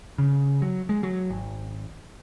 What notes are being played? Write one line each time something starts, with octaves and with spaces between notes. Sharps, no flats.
C#3
F#3
G#3
F#3
G#1